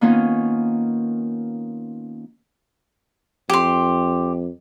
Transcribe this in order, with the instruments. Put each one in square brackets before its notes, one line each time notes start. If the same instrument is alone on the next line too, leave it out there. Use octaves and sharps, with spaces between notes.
[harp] D#3 A#3 B3 C#4 D#4 F4
[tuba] F2 [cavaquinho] G4 C6